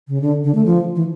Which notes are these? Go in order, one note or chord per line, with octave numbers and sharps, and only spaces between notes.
C#3
D3
D3
A3
F3
E3